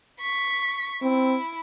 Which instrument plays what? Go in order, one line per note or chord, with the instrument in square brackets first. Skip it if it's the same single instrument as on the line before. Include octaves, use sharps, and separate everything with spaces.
[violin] C#6 B6
[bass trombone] C4 [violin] E4